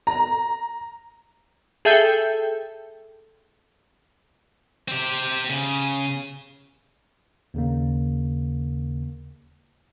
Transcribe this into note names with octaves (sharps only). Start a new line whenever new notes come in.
A#5
G#4 A4 E5 G5 G6
C4 G4
C#3
D#2 C#3 A#3